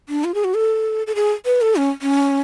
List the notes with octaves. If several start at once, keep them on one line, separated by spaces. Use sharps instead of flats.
D4
F4
G#4
F#4
A4
A4
G#4
B4
A4
C#4
C#4